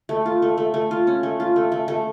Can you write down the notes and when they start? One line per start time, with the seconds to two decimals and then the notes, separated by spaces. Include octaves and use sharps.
0.09 A3
0.26 F4
0.42 A3
0.58 A3
0.74 A3
0.91 F4
1.07 C#4
1.23 A3
1.40 F4
1.56 A3
1.72 A3
1.88 A3